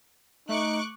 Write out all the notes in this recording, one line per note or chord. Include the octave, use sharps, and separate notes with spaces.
A3 D#4 C#6 D6 F#6